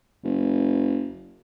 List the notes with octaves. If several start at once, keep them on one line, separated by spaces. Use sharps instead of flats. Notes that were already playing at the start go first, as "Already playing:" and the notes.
F#1